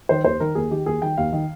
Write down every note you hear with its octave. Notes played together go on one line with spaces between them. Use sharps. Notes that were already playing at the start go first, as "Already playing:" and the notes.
D#3 C5
D#2 C5
D#3 A#4
D#2 G#4
D#3 G4
D#2 G#4
D#3 G5
D#2 F5
D#3